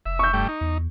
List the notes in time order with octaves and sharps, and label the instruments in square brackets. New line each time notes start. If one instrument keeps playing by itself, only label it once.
[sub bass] F1 [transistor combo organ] E5
[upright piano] C#6 G6
[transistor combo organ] G2 A3 G5
D#4
[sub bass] E2